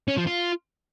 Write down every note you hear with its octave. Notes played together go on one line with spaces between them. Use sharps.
C#4
F3
F4